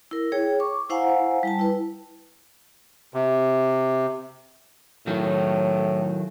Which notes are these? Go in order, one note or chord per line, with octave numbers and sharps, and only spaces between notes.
E4 A#4
G#4 C#5 G5
C#6 D6
E4 C5 F5 F#5 G#5 A#5
G3 G5 A5
E4 B4
C3
A2 D#3 F#3